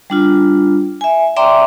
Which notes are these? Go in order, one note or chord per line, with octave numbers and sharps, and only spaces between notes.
G3 D4 F4
E5 G#5
D5 E5 G5 A#5 C6 D6